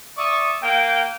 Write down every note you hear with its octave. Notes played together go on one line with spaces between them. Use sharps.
D5 E5 C#6 D#6
A#3 F5 G5